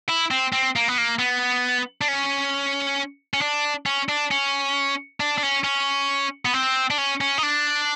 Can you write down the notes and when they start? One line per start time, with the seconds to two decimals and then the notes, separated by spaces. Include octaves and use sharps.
0.09 E4
0.31 C4
0.53 C4
0.76 A#3
0.88 B3
0.98 A#3
1.19 B3
2.01 D4
2.08 C#4
3.34 C#4
3.41 D4
3.86 C#4
4.09 D4
4.31 C#4
5.20 D4
5.38 D4
5.43 C#4
5.64 C#4
6.45 B3
6.54 C4
6.90 D4
6.98 C#4
7.21 C#4
7.38 D#4
7.43 D4